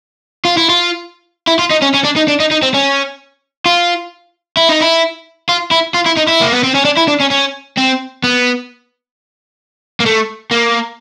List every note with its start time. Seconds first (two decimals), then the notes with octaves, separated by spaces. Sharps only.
0.45 F4
0.57 E4
0.69 F4
1.47 E4
1.59 F4
1.71 D#4
1.82 C#4
1.94 C#4
2.05 D4
2.16 D#4
2.28 D4
2.40 D#4
2.51 D#4
2.62 C4
2.74 C#4
3.66 F4
4.57 E4
4.69 D#4
4.81 E4
5.49 F4
5.71 E4
5.94 F4
6.06 E4
6.17 D#4
6.28 E4
6.42 A#3
6.53 B3
6.64 C4
6.75 C#4
6.85 D4
6.97 E4
7.08 D4
7.21 C#4
7.31 C#4
7.78 C4
8.24 B3
10.00 A#3
10.06 A3
10.51 A#3